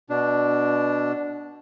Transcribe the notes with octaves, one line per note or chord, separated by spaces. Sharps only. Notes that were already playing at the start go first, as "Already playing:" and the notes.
B2 D4